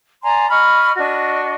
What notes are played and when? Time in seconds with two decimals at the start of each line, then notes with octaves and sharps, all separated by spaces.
0.23 D5 G#5 A#5 C6
0.49 D#5 B5 C#6 F6
0.97 D4 F#4 D#5 C#6